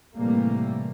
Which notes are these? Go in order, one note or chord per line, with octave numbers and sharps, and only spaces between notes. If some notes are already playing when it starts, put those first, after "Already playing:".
A2 C3 E3 G3 A3 A#3